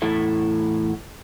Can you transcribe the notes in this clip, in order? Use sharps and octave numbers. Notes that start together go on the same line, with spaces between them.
E2 A2 E4 A4 E5